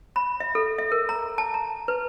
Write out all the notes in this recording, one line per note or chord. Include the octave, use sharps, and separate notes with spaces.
B5
E5
A4
E5
A#4
A#5
A5
A#5
B4